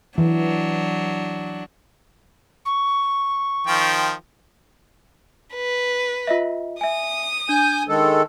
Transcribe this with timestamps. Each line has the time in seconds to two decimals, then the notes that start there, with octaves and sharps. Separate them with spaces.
0.18 E3 F#3 D4
2.65 C#6
3.67 D#3 F3 G5
5.55 B4
6.27 F4 D#5 E5
6.81 E5 G#5 D#6
7.49 D4 G#5 G6
7.88 D#3 G#3 A4